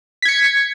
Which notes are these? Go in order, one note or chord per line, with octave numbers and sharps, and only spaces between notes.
G#6 B6 C#7